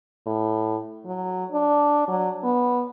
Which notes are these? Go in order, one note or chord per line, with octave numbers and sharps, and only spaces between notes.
A2
F#3
D4
F#3
B3